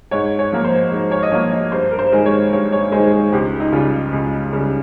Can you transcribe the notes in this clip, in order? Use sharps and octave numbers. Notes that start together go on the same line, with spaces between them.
G#2 C#5
C#5
F3 A#3
C5
G#2
C#5
D#5
F3 A#3 C#5
D#5
G2 C5
A#4
C5
D#3 G#3
C#5
G2 C#5
C#5
D#3 G#3 C5
G#4
C#2 G4
D#4
C#3 G3 F4
C#2
C#3 G3